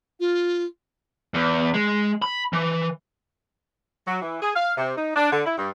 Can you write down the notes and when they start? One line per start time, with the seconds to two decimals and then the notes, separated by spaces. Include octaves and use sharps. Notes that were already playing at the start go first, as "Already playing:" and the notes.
0.20 F4
1.34 E2
1.74 G#3
2.22 B5
2.53 E3
4.06 F#3
4.22 E3
4.41 G#4
4.55 F5
4.77 C3
4.97 D#4
5.16 D4
5.32 D3
5.46 E4
5.58 G2